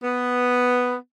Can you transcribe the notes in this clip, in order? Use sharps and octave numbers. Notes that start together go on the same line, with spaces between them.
B3